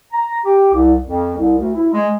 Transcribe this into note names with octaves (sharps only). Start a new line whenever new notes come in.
A#5
G4
C2
F2
C2
D2
E4
G#3